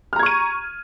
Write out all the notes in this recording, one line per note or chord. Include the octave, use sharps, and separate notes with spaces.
A#5 C#6 F6 G#6 D#7